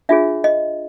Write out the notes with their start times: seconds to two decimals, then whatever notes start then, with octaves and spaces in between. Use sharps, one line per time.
0.09 D4 F4 G#4 C#5 E5
0.44 D#5